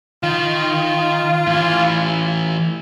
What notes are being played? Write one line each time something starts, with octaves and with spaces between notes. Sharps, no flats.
D#3 F4
A2 E3